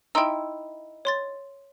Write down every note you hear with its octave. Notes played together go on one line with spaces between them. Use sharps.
D#4 E4 G5 C6 E6
C#5 C6 A6